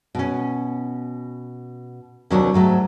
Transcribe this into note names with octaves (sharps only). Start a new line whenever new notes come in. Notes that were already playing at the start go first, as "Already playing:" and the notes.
B2 C#4
D#2 C3 F#3 A#3 D4 C#5
G#2 F#3 A3